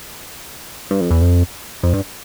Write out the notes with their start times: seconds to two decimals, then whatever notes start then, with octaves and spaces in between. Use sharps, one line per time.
0.91 G2
1.01 F2
1.10 E2
1.21 F2
1.83 F2
1.93 G2